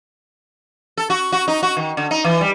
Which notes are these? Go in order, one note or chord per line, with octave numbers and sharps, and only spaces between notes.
A4
F#4
F#4
D#4
F#4
D#3
D3
D#4
E3
G3